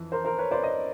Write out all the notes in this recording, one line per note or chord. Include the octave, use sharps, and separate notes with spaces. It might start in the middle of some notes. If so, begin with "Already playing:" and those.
Already playing: F2 E3
A#4 C5
A#4 C5
B4 C#5
C5 D5
C#5 D#5